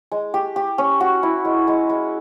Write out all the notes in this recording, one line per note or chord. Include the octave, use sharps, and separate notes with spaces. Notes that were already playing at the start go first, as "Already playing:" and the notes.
G#3
G4
G4
C#4
F#4
E4
G#3
G#3
G#3